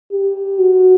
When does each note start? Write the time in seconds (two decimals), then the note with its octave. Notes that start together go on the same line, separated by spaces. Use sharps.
0.12 G4
0.59 F#4